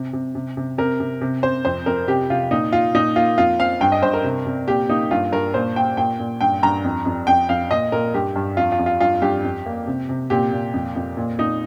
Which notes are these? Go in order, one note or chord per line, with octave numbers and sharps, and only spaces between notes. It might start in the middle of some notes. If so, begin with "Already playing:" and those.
Already playing: C3
C3
C3
C3
C3 A#4
C3
C3
C3 C5
F2 C5
F2 A#4
C3 G4
C3 F4
A#2 D#4
A#2 F4
A#2 D#4
A#3 F4
F2 F4
C4 F5
G2 G5
D#5
G2 C5
A#4
C3
C3
A#2 G4
A#3 D#4
G2 F4
G2 A#4
A#2 C5
A#3 G5
A#2 G5
A#2
G2 G5
G2 A#5
F2
F2
F2 G5
F2 F5
A#2 D#5
A#2 A#4
G2 G4
G2
F2 F4
F4
F2
F4
G2 F4
G2 G4
F2
A#3
C3
C3
A#2 G4
A#2
F2
F2
A#2
A#2 D#4